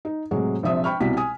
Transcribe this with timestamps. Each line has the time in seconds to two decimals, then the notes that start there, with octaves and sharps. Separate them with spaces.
0.05 D#4
0.31 A2 C3 F#3 G#3
0.63 A#1 C3 F3 E5 D#6
0.84 G5 B5 C#6 F6
1.00 C2 B2 E4 F#4 B6
1.17 G#5 D#6